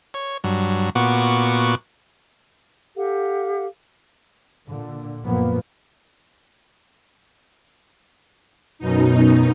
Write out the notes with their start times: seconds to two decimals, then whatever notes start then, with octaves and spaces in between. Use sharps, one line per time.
0.14 C#5
0.44 G2 F#3
0.95 A#2 B3 F#4 C#6 D6
2.96 G4 A4 F5 F#5
4.69 A#2 D3
5.22 F#2 A#2 F3 A#3 B3
8.79 F#2 B2 D#4